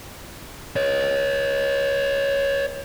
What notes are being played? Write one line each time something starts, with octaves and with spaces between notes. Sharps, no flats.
C#5 D#5